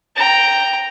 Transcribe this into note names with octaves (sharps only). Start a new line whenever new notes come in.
G5 A#5